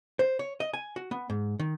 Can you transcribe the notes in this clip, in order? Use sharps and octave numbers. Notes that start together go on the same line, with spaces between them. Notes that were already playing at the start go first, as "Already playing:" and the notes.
C5
C#5
D#5
G#5
F#4
B3
G#2
D#3